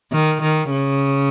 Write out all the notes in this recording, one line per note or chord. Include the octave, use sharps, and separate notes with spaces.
D#3
D#3
C#3